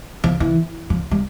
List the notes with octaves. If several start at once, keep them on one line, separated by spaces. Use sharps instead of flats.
F3
E3
F3
G3